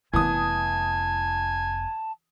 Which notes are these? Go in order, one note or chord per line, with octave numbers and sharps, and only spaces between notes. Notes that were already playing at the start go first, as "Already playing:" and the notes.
F1 E3 B3 G#5 A5 D#6